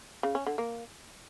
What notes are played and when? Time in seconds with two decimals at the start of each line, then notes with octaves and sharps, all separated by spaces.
0.23 C#3
0.35 C#4
0.46 D3
0.58 A#3